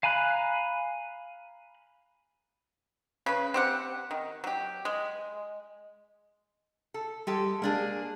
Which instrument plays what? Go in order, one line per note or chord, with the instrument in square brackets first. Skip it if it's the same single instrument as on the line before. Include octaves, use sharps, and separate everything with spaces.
[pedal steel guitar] F5 G#5 A#5 B5 F#6
[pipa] C#3 B4
C4 G4 F#5
D#3
F#3 G4
G#3
[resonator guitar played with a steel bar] A4
[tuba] G3 [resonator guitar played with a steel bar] G#3 G4 A4
[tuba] G#3 [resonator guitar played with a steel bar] A#3 D4 G#4